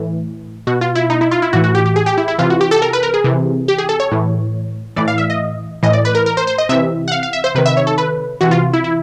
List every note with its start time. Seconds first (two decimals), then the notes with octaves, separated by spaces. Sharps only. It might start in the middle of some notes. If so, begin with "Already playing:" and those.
Already playing: A2 E3
0.67 B2 F#4
0.81 F4
0.95 E4
1.10 D#4
1.21 E4
1.31 F4
1.42 E4
1.53 A2 E3 F#4
1.64 F#4
1.75 G4
1.86 G4
1.96 G#4
2.06 G4
2.18 E4
2.28 E4
2.38 C3 E3 F4
2.50 F#4
2.61 G4
2.71 A4
2.82 A#4
2.93 B4
3.03 A#4
3.14 G#4
3.24 C3 E3
3.68 G4
3.78 G#4
3.89 A4
4.00 C#5
4.12 A2 E3
4.96 A2 E3 D5
5.08 F5
5.18 E5
5.30 D#5
5.83 A2 E3 D#5
5.93 D5
6.05 B4
6.15 A#4
6.26 A#4
6.37 C5
6.47 C5
6.58 D#5
6.69 C3 E3 E5
7.08 F#5
7.12 F5
7.23 F5
7.33 E5
7.44 C5
7.55 C3 D#3 B4
7.66 E5
7.77 C#5
7.87 A4
7.98 B4
8.41 C3 E3 F#4
8.51 F4
8.73 E4
8.84 E4